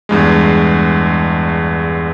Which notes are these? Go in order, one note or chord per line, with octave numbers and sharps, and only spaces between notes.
E2 G2 G#3